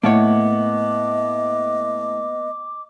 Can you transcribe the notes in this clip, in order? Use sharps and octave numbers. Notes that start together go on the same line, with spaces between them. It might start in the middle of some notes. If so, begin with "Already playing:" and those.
A2 A#3 B3 C#5 D#5 D6